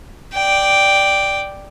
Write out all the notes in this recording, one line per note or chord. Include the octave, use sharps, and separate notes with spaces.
D5 G5